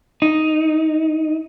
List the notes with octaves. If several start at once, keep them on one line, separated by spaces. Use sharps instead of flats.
D#4